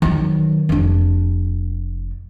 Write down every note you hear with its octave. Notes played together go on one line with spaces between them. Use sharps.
D#3 F#3
F1 D4